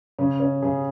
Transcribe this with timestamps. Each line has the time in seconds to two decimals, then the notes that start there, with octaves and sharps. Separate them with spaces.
0.19 C#3 C#4
0.40 C#4
0.62 C#3 G#4